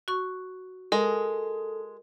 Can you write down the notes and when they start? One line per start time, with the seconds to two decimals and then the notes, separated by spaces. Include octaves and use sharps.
0.08 F#4 C#6
0.92 G#3 A4 A#4